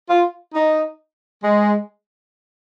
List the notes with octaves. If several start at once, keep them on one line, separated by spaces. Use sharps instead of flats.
F4
D#4
G#3